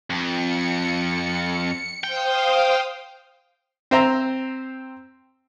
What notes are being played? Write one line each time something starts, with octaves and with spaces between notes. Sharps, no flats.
F2 C#7
C5 F5 G5 D#6
C4 C5 E5 A#5